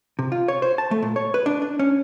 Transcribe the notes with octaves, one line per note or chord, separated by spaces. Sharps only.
C3
F4
C#5
C5
A5
A3
A#2
C#5
B4
D4
D4
C#4